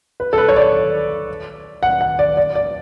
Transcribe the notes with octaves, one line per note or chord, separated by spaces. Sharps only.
B4
A4
B4
C#5
D5
F#5
F#5
D5
D5
D5